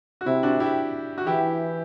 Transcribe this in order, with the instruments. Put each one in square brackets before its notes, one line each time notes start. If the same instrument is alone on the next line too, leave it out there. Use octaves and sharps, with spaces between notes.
[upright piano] F#4
[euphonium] C3 [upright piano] E4
[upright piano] D4 F#4
E4 G4
F#4
[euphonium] E3 [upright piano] E4 G4